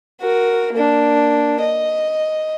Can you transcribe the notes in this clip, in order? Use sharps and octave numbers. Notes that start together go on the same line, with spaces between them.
F#4 A#4
A#3 D4
D#5